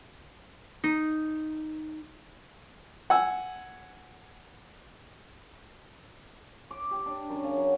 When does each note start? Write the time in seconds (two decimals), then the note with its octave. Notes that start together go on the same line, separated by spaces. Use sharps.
0.84 D#4
3.10 F#5 G#5 E6
6.71 D6
6.91 G4
7.06 D4
7.29 F#2
7.44 C#3
7.57 F#3